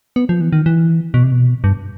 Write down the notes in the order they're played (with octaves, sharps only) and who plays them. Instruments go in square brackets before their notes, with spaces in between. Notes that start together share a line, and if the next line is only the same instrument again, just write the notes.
[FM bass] B3
F3
E3
D#3
E3
B2
C3
B2
G2